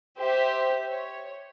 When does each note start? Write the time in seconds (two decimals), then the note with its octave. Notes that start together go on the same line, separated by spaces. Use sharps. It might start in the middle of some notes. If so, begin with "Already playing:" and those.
0.19 G4 C5 E5
0.91 C#5